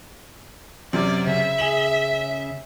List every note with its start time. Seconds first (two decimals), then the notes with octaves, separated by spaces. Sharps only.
0.93 F#2 C3 C4 D5
1.27 C#3 E5
1.58 G#4 E7 F#7